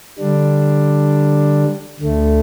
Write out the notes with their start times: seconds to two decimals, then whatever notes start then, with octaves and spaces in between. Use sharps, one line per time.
0.19 D3 G3 D4
2.00 D2 D3 A3